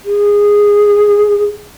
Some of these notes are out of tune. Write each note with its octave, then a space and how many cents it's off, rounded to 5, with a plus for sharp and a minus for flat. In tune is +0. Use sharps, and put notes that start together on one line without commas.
G#4 -10